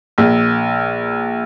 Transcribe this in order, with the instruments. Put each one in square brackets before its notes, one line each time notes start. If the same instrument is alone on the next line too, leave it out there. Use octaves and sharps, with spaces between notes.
[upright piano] A#1